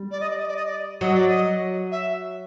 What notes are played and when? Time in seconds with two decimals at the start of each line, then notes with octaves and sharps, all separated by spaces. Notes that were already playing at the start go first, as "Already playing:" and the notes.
Already playing: G3
0.11 D5
0.20 D#5
0.30 D5
0.39 D#5
0.48 D5
0.56 D#5
0.66 D5
1.01 F#3 D#5
1.15 D5
1.28 D#5
1.92 E5